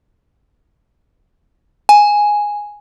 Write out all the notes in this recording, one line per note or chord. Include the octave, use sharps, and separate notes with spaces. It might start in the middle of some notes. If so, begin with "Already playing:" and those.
G#5